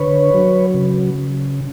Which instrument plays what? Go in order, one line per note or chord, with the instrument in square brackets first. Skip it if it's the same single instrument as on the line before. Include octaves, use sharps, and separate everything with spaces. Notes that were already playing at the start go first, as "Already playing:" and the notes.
Already playing: [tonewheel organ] D3 B4 C#5
F#3
C#3